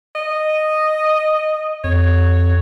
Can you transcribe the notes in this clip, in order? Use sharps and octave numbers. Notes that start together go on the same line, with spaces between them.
D#5
F2 C#5